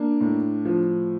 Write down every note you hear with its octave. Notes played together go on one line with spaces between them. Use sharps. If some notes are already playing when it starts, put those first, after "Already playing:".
Already playing: A#3 D4
A2
F3